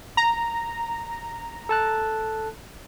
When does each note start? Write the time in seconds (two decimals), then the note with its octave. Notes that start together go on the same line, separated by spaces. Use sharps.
0.17 A#5
1.69 A4 A5 F#6